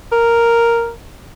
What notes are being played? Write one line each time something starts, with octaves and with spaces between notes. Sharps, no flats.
A#4